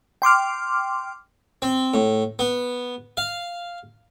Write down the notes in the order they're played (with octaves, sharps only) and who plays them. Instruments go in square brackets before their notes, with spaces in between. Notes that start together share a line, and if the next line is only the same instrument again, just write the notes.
[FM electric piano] G5 C6 D6 F6
[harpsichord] C4
A2
B3
F5